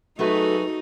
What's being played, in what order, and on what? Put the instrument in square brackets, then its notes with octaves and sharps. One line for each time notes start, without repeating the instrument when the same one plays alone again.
[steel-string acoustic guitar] F#3 G#4 B4 [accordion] A3 [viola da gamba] D#4 [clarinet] F#4